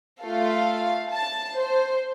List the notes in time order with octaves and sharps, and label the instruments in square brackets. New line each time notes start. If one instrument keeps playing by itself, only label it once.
[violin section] A3 F4 A4 F5
A5
C5